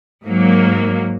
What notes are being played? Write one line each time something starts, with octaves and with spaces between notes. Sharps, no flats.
G#2 F#3 A#3